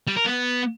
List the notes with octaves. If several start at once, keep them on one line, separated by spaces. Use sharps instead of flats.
G3
A#4
B3